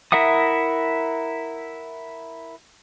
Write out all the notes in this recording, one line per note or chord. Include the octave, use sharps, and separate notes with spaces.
E4 A#4 E5 F#5 D#6